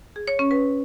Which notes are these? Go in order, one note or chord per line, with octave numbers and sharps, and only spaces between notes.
G#4
C#5
C#4
B4